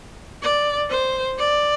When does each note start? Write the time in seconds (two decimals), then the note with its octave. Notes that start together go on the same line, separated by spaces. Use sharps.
0.42 D5
0.90 C5
1.38 D5